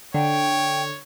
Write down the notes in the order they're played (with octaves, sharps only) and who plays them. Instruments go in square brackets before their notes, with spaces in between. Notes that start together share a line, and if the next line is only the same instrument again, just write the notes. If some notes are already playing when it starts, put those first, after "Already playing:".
[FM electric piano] D3 [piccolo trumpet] C#5 [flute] G5